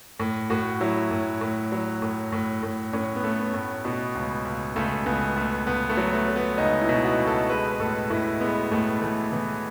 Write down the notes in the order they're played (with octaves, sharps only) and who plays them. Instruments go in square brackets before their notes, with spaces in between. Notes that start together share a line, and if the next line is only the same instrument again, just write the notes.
[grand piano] A2
A2 F#4
F#3 E4
A2
A2
F#3
A2
A2
A2
A2 C#4
B3
A3
B3
A2
B2 B3
C#2
C#2
C#2 A3
C#2 B3
C#2 A3
C#2 B3
A3
F#3
A3
F#3
B3
C#2 D#4
E4
B2
F#4
C#2
A4
G#3 B4
B4
A2 A4
A2 E4
G#3 B3
A2 A3
E3 A3
E3 B3